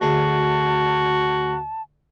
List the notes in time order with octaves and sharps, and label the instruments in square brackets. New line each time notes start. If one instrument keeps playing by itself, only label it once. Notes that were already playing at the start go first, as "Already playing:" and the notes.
[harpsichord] D2 G#4 [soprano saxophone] F#4 [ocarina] A5